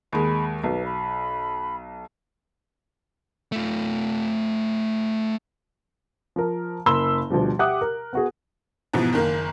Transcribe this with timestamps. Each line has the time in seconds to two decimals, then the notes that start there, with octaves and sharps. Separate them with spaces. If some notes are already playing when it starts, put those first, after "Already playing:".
0.13 D#2 G#3 B5
0.64 B1 B4
0.85 B5
3.52 A3 F4
6.36 F3 A#4
6.86 F#1 A#3 B5 C6 E6 G7
7.30 D2 B2 F3 G3
7.59 G4 E5 F#5 D6 D#6 F#6
7.81 A#4
8.13 B3 F#4 G#4
8.93 G#2 B2 E3 F3
9.13 F#1 D#3 A#3